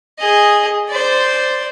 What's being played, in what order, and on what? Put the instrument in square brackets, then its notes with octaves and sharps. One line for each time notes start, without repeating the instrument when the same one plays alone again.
[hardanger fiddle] G#4 D#5
C5 D5